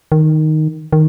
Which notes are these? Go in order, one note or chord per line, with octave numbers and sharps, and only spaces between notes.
D#3
D#3